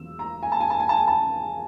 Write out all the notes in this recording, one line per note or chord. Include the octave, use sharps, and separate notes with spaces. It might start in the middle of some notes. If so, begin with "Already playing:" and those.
Already playing: E1 E2 F#3 E6
A#5
G#5
A5
G#5
A5
G#5
A5
G#5
A5